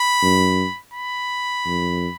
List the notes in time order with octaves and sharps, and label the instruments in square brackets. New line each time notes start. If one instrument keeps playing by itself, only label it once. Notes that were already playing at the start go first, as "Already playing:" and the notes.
Already playing: [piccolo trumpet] B5
[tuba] F#2
[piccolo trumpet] B5
[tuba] F2